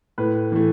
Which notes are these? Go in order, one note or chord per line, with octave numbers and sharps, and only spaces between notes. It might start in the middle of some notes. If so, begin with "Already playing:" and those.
A2 B4
E3 A3